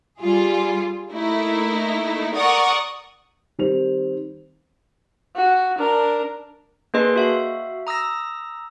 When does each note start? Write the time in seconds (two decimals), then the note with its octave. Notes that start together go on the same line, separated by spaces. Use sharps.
0.21 G3 F4 G#4
1.12 A3 A#3 D#4 E4
2.34 A#4 D5 F#5 C#6 D#6
3.59 D#3 G3 C4 F7
5.36 F#4
5.78 D4 A#4
6.94 A#3 D4 G#4 B4 D#5 C6
7.16 F#4 E5 F5
7.87 A#5 D#6 E6 A#6